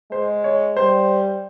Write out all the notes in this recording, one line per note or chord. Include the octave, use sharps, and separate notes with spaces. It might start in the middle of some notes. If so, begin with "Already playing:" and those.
G#3 C5
C#5
G3 C5